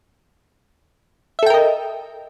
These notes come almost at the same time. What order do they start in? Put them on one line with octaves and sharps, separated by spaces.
E5 A4 G5 A#4 D#5